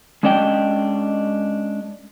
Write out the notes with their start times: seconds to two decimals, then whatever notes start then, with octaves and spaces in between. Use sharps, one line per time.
0.23 G#3 C#4 D4 D#5 G5